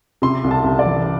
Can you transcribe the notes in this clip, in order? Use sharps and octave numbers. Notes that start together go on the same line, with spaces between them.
C3 C6
C2
A5
C2
D5
E3